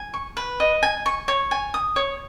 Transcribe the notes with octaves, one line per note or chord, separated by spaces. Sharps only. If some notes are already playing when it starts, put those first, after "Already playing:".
Already playing: G#5
C#6
B4
D#5
G#5
C#6
C#5
G#5
D#6
C#5